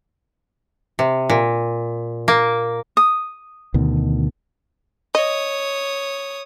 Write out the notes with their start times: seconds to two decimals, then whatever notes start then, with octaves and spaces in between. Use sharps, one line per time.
0.99 C3
1.30 A#2
2.28 A#3
2.97 D#6
3.74 D2 B2 D#3
5.15 C#5 D#5 D#6